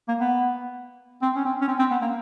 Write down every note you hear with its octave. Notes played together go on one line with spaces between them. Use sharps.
A#3
B3
C4
C#4
C4
C#4
C4
C4
B3
A#3